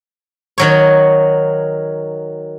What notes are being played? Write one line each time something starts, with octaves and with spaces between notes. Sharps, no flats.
D#3 F#3 C#5